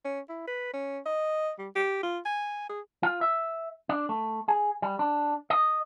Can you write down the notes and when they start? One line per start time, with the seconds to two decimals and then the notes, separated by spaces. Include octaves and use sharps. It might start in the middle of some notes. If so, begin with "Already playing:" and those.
0.04 C#4
0.29 E4
0.47 B4
0.73 C#4
1.06 D#5
1.59 G3
1.75 G4
2.03 F4
2.25 G#5
2.69 G#4
3.03 F4
3.21 E5
3.89 D4
4.09 A3
4.48 G#4
4.82 G3
4.99 D4
5.50 D#5